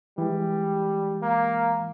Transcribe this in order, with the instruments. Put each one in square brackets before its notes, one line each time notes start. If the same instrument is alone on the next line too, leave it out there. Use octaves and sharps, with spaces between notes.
[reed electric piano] E3 G#3 [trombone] G3
[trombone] A#3